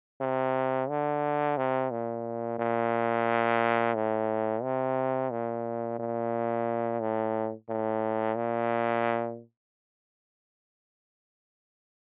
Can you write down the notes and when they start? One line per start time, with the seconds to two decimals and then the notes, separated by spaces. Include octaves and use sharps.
0.20 C3
0.89 D3
1.57 C3
1.91 A#2
2.59 A#2
3.95 A2
4.63 C3
5.31 A#2
5.99 A#2
7.01 A2
7.69 A2
8.36 A#2